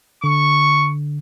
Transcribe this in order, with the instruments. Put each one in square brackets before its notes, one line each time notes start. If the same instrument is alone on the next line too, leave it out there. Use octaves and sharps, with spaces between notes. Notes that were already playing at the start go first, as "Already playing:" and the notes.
[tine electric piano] D3 [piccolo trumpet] C#6